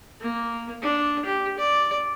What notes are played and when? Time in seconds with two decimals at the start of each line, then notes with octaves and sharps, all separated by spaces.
0.20 A#3
0.82 D4
1.25 G4
1.58 D5